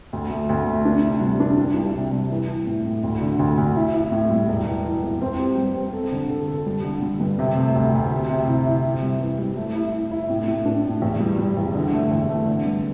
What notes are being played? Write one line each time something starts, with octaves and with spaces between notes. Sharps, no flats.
D2
A3
D2
A3
D4
C3
G3
D4
D4
C2
C3
G3
E3
E3
A2
A2
D2
D3
D2
D2
E4
E4
A2
G3
E1
E3
E3
E1
C4
G4
G2
C4
A4
D3
A4
A4
G3
D3
G3
G2
C3
A3
D2
D2
G4
C3
E4
E4
C3
G3
E3
G3
A3
E4
E4
E4
A2
A2
D4
A2
E2
G3
G3
E2
D3
A3
E2
A3
D3
G2